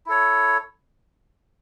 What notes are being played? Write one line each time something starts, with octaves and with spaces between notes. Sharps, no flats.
E4 A4 C#5